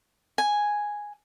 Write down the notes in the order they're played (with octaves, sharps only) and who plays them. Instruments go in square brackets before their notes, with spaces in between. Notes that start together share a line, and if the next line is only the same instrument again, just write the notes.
[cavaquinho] G#5